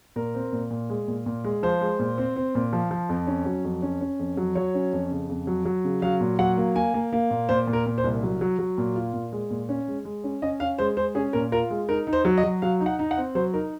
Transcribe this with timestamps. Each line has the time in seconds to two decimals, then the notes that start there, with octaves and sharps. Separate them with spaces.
0.16 A#2 A#4
0.35 C4
0.53 A#2
0.71 A#2
0.89 G#3
1.08 A#2
1.26 A#2
1.44 G#3
1.63 F3 C5
1.81 G#3
1.99 A#2
2.18 C4
2.36 C4
2.55 A#2
2.73 F3
2.91 F3
3.09 F2
3.27 C#4
3.45 F#3
3.64 F2
3.82 C#4
4.01 C#4
4.19 F2
4.37 F#3
4.55 F#3 C#5
4.74 C#4
4.93 F2
5.11 C#3
5.29 F2
5.47 F#3
5.65 F#3
5.84 C#3
6.02 F#3 F5
6.21 A#2
6.39 F#3 F#5
6.58 A#3
6.75 A#3 G#5
6.94 A#3
7.12 A#3
7.31 A#2
7.49 A#2 C5
7.67 A#2
7.73 A#4
7.86 A#2
7.98 C5
8.04 C2
8.23 F#3
8.41 F#3
8.59 F#3
8.78 A#2
8.95 F4
9.14 A#2
9.32 G#3
9.50 A#2
9.69 C#4
9.88 G#3
10.05 G#3
10.24 C#4
10.42 C#4 D#5
10.60 C#4 F5
10.78 G#3 C5
10.97 G#3 C5
11.15 C#4 G#4
11.33 A#2 A#4
11.52 F4 A#4
11.70 G#3
11.89 D#4 A#4
12.07 D#4
12.13 C5
12.25 F#3
12.38 D#5
12.44 F#3
12.62 F#3 F5
12.80 D#4
12.86 F#5
12.99 D#4
13.11 F#5
13.17 C4
13.35 F#3 C5
13.53 D#4 A#4